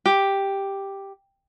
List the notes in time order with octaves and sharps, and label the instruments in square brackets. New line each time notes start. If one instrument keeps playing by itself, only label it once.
[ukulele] G4